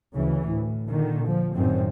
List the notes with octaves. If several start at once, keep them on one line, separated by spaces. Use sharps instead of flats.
D2 C#3 E3
A2
A#2 D3 D#3
F3
F#2 A2 D#3 C4